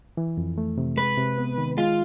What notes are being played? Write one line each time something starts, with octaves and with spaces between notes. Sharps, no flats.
E3
F2
A3
C3
G#3 B4
C3
B3
D#3
G#3 F4